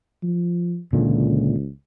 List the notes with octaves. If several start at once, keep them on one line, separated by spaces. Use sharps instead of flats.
F3
C#2 A#2 D3 E3